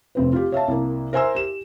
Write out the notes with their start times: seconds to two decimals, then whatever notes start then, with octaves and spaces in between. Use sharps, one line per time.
0.15 F1 C4 B4
0.33 F4 G4
0.52 C#5 E5 F5 A5
0.68 C2 A#3
1.13 A#4 C5 E5 G#5 C6 E6
1.35 G4 E7